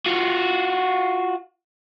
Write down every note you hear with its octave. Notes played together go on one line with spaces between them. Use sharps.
F4 F#4